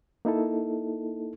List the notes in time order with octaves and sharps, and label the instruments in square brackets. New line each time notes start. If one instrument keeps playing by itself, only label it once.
[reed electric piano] A#3 D#4 E4 A4